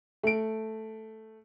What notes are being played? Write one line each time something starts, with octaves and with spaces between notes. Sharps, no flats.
A3 D7